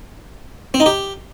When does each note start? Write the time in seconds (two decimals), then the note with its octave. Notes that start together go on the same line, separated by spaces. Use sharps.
0.74 C4
0.80 D#4
0.86 G4